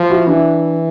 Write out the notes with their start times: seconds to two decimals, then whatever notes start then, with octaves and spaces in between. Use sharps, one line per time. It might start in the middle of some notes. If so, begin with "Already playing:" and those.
Already playing: F3
0.10 E4 F#4
0.27 E3 D4 E4